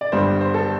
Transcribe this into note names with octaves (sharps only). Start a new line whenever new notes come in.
D5
G1 G2 G3 C5
C5
A4